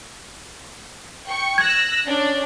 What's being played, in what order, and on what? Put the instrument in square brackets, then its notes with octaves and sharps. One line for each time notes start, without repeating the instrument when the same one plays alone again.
[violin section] G5 C#6
[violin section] E6 F#6 A#6 [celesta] G#6
[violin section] C#4 D4 D5